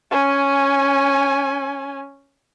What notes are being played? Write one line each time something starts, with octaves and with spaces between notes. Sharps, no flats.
C#4 G#5